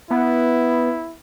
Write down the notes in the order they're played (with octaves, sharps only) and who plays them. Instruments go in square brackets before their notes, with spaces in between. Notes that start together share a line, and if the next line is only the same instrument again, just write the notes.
[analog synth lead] B3 [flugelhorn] E4